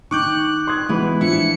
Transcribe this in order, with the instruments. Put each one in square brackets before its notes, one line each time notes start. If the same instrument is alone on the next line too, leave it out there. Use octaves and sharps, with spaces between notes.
[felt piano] D#3 [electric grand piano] C#6 D6 G6 [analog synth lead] F#6
[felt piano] C6 D#6 G#6
[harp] E3 [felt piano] G#3 B3
[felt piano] F3 D4 [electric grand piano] E4 [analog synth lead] C#7